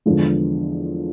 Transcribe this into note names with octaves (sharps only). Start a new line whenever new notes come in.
E2 D3 F3 G#3